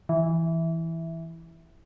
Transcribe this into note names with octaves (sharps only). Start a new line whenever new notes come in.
E3